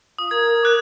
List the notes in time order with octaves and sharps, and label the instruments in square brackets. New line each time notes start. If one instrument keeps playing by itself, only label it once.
[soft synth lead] F4 [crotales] D#6
[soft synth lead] A#4 [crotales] G#6
[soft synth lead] A#4 [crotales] D6 F#6 G#6